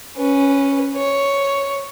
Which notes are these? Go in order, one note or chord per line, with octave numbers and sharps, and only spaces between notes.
C#4 B4
C#5